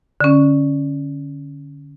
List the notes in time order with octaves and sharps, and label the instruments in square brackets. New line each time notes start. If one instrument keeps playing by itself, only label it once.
[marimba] D3 C#4